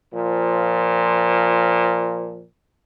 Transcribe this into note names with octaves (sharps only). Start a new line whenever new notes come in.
A#2 F3